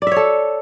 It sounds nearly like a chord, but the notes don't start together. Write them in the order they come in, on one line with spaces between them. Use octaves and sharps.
D5 E5 C#5 A4